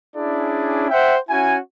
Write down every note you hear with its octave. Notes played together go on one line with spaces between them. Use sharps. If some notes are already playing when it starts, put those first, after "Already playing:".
C#4 D4 E4 G#4 D5
C5 E5 F#5 G5
C#4 E4 F#4 G#5